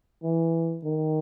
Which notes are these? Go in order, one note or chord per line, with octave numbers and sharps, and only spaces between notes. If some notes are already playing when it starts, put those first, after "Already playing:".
E3
D#3